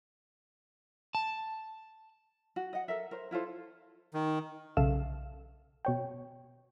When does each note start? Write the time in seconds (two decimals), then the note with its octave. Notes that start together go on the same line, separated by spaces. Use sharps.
1.15 A5
2.56 F#4
2.73 D#5 F#5
2.88 A4 A#4 E5
3.11 A#4 C5
3.31 E4 F4 A4 C5
4.14 D#3
4.77 B1 C#3 A4 E5 F5 E7
5.85 B2 C#5 G5